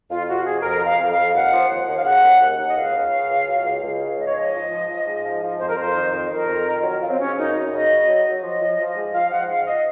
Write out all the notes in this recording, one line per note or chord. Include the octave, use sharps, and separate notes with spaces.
F2 F4
C3 F#4
F2 G#4
F2 A#4
F3
F5
F2
F5
F2
D#2 F#5
F3
D#2
D#2
F5
C#3 F#5
D#2
D#2
D#2
D#5
C#2 F5
C#3
C#3
C#2
F#3
C#2
C#2
C#3
G#2 D#5
C#5
F3 D#5
F3
F3
F3
G#2
F3
F3
F2 C5
A#4
F2 C5
D#3
F2
F2 A#4
F2
D#3
F#3
F#3 F4
C4
C#3 C#4
F#2 D#4
F#2
C#3 D#5
F#3
F#3
F#3
F3 D#5
F3
F3
G#2
F3 F5
F3 F#5
G#2 F5
D#5